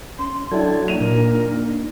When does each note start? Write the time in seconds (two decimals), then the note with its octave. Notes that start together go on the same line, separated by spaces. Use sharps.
0.19 C#4 C6
0.51 F#3 D4 E4 A4 D5 G5 G#6
0.88 A#3 D4 D#4 D#7 F7
1.00 A#2 A#4